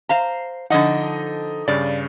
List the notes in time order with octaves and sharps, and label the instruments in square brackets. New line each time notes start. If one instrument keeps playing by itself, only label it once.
[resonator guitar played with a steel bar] C5 F5 A#5
[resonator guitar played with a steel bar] D3 F3 F#5 [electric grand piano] D#4 D#5
[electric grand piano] G2 C#3 [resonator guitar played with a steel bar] D5